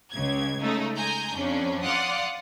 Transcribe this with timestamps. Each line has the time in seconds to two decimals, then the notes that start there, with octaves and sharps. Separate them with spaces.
0.11 C#2 C#3 G#6
0.60 C#3 G#3 A3 D#4
0.97 G#3 G#5 A#5 G6
1.36 F2 C#4 D4
1.83 D5 F5 F#5 C6 D#6